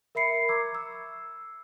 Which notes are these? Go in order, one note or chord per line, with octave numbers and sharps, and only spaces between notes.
A#4 E5 B5 C7 C#7
A#5 C#6 D6 E6 G#6
E6